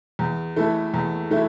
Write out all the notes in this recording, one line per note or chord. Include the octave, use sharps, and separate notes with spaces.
E2
E3 A3 E4 A4
E2
E3 A3 E4